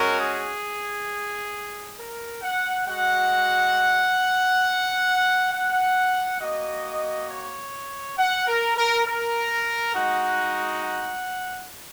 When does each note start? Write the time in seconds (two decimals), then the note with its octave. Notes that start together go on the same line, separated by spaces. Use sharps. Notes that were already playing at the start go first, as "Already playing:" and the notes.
Already playing: G#3 C#4 F#4 A#4
0.20 G#4
1.98 A#4
2.42 F#5
2.86 G#3 F#4 F#5
5.52 F#5
6.40 A#3 F#4 D#5
7.29 C#5
8.18 F#5
8.47 A#4
8.76 A#4
9.05 A#4
9.94 G#3 D#4 F#4 F#5
10.83 F#5